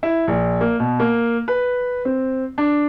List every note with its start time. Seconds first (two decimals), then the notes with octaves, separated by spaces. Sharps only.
0.03 E4
0.27 A#1
0.61 A#3
0.80 B2
1.00 A#3
1.48 B4
2.05 C4
2.58 D4